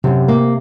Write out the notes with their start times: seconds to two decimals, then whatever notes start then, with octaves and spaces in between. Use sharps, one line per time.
0.04 F#2 C3
0.28 A#3